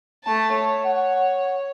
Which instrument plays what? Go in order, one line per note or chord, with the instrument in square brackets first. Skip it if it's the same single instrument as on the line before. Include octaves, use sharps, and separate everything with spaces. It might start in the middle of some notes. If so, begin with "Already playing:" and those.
[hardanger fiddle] A3 A5
C#5
[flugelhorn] F#5